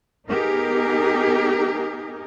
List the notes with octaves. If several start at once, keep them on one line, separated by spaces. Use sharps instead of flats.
B3 D#4 G4 G#4 A#4